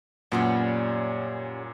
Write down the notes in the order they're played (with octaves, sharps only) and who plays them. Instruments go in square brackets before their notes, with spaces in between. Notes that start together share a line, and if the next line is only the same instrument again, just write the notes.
[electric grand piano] F#2 A#2 [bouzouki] G3 B3 C#4